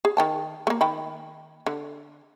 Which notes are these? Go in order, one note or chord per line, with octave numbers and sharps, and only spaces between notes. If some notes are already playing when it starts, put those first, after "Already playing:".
G#4
D#3 G5 A5
A3 A#3
D#3 G5 B5
D3